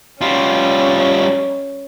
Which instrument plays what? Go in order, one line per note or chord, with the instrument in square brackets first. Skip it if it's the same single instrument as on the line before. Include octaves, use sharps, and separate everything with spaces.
[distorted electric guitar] G3 F4 [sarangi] C#4